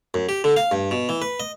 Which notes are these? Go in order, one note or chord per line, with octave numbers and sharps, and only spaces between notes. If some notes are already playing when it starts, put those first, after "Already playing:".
F#2
G4
D3
F5
G2
B2
E3
B4
D#5